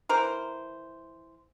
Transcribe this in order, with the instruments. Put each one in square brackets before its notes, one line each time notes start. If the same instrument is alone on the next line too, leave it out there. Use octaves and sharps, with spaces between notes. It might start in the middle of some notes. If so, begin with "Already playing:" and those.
[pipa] E3 A#4 C5